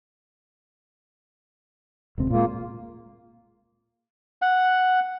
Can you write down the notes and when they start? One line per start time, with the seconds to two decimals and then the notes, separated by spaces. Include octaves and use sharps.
2.18 E1 C#2 C4
2.31 A#2 G#3 A#3 F4
4.42 F#5